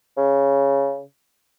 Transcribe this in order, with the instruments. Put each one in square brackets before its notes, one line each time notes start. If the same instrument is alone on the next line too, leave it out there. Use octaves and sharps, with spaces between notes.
[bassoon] C#3